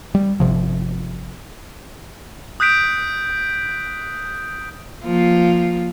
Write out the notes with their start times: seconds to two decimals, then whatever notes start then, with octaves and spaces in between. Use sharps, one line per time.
0.15 G3
0.40 G1 C#2 C3 F3
2.60 D#6 F#6 G6 B6 D7
5.04 F3 A#3 F4